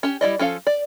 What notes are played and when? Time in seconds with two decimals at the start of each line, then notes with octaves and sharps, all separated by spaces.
0.03 C#4 G4
0.21 G3 E4 D5 D#5
0.39 F3 C#4 A4 F5
0.67 D5